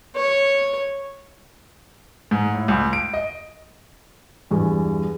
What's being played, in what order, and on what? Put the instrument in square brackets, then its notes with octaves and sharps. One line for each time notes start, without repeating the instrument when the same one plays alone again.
[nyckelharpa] C#5
[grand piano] G#2
A2
C#2
D7
D#5
[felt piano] E2 G2 E3